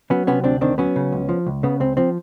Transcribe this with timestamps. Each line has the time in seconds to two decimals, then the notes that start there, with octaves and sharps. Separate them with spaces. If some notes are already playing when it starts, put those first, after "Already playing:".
0.10 F#3 B3 C#4
0.27 C3 B3 C#4
0.44 D2 C4 D4
0.61 D#3 C4 D4
0.78 F#3 B3 C#4
0.96 C#3
1.12 C#2
1.29 F3
1.47 C#2
1.63 C#3 B3
1.80 C#2 C4
1.97 F3 C4